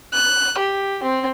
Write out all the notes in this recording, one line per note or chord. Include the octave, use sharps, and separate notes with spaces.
F#6
G4
C4